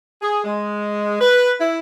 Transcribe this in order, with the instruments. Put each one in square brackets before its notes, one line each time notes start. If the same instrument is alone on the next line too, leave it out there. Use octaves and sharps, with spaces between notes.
[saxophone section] G#4
G#3
B4
E4